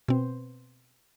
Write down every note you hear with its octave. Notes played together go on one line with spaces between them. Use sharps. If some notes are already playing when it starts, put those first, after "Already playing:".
B2 C4